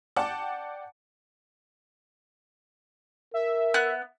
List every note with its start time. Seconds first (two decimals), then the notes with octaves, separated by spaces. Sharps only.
0.16 D5 F#5 G5 A5 D6
3.34 A#4 E5
3.74 B3 F#6